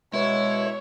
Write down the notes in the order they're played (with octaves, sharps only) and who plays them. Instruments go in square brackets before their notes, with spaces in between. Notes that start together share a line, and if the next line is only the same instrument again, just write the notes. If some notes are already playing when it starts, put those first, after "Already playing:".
[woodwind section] B2 G#3 [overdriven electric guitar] E4 [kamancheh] C#5